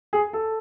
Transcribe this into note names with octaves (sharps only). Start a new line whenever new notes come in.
G#4
A4